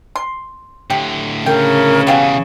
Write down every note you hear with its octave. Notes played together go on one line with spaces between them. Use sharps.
C6
A2 D3 G4
C#3 A#4 G5
B2 E3 B3 G4 G#4 F5